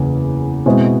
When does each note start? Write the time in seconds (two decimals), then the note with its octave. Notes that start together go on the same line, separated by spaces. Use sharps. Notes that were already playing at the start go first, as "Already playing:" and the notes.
Already playing: F#1 E2 C#3
0.66 B2 G#3 C4 E4